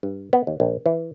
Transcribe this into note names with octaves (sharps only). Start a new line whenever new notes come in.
G2
B3
D#2
A#1
E3